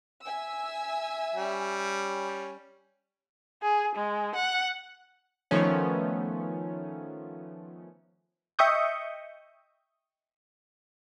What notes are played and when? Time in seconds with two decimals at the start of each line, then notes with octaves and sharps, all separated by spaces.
0.24 E5 G#5 E6
1.36 G3 C#4
3.62 G#4
3.95 G#3
4.35 F#5
5.51 D#3 F3 A3 B3 C#4
8.59 D#5 E5 G5 C#6 D#6 G6